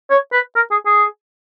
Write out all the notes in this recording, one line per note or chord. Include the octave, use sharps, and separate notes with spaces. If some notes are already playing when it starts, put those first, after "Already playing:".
C#5
B4
A#4
G#4
G#4